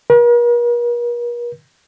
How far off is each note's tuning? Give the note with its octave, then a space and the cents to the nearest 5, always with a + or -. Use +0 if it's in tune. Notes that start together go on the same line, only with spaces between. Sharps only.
A#4 +45